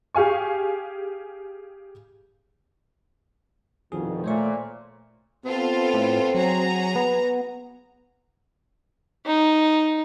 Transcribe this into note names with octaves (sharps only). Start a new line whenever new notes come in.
G4 G#4 F5 G#5 C#6
C2 F2 B2 D#3 F3 G#4
A#2 A3 C5 C#5 C#6
B3 C4 F4 A4
A2
F#3 F#4 G#4 A#5
B3
D#4